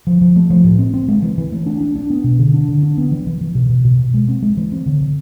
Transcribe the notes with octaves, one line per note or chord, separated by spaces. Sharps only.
F3
F3
A3
F3
A2
C4
C4
G#3
E3
E3
A3
D4
D4
D4
B3
B2
D3
D4
D3
D4
B3
E3
E3
E3
B2
B2
B2
B2
G#3
C4
G#3
E3
C4
D3
D3